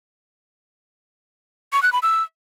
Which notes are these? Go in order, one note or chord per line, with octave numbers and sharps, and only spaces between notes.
C#6
F#6
B5
E6